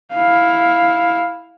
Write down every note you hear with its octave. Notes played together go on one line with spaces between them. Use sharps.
E4 F5